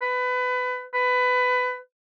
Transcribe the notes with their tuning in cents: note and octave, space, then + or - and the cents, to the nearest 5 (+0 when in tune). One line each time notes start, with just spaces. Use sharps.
B4 +25
B4 +20